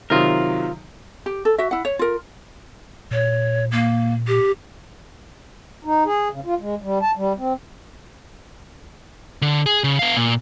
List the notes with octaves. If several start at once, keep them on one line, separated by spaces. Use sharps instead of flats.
C3 D#3 F#3 F4 A#4
G4
A4
F#4 E5
E4 F#5
C#5
F4 A#4
A#2 C#5
A#3
G4
D#4
G#4
C#3
F4
G#3
G3
A5
G3
C4
D3
G#4
C#3
B3 F5
A#2